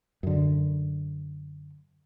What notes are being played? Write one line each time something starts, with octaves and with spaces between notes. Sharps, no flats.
F#2 D3